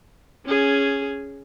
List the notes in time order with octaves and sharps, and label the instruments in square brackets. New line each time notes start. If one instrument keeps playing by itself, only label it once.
[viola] C#4 G#4